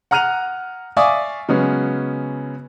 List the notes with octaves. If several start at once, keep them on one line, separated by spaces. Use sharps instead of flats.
F#5 A#5 F6 F#6 D#7 F7
D5 E5 F5 G#5 C#6 D#6
C#3 F#3 G#3 B3 C#4